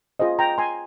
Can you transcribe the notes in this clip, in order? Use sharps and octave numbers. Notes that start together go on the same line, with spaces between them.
F4 G#4 C5 D#5
G5 A#5
G#5 C6